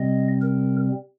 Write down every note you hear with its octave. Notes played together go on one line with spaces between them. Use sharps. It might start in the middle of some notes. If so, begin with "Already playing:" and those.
Already playing: C3 G3 C4 D#5
A#4